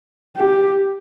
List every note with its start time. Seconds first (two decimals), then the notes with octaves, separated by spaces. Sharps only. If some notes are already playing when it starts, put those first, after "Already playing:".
0.37 G4